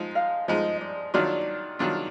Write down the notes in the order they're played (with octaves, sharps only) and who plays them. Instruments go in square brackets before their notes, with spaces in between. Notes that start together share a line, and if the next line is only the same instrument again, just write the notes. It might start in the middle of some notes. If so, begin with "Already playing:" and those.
Already playing: [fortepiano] F3 G#3 D#4
[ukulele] F5
[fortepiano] F3 G#3 D#4 [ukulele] D#5
[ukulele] D5
[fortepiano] D#3 F#3 D4 F4 [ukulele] D5
[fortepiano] D#3 F#3 D4 F4